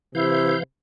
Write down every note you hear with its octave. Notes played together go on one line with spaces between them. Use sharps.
C3 E3 E4 F5 G6